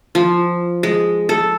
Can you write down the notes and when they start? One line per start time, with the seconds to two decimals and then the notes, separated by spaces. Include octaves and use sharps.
0.15 F3
0.83 G#3
1.29 A4